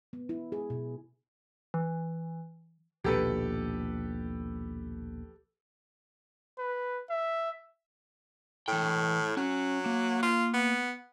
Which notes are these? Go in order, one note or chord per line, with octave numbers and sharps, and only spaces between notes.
B3
E4
G#4
B2
E3
A#1 D#2 B2 G4 A4 B4
B4
E5
A2 E3 G5
F#3 C#4
A#3
F4
B3